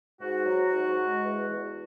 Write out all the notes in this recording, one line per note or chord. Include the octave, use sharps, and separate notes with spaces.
G#2 F#4
F#3
G#2
G#3
E2
E2